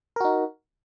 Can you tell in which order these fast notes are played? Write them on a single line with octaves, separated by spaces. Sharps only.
A#4 F#4 D#4